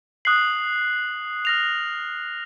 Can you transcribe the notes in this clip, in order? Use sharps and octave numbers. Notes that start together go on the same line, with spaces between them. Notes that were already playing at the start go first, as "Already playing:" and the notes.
D#6 F#6 C7 F#7
F6 A#6 F7